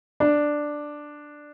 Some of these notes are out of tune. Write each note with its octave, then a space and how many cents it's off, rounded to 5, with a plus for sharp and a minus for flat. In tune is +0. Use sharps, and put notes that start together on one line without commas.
D4 +5